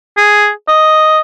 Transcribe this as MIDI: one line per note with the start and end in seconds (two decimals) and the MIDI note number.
0.17 0.50 68
0.68 1.20 75